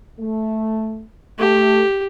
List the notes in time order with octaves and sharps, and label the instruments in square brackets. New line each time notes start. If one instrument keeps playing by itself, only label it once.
[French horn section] A3
[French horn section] A3 [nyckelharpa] G4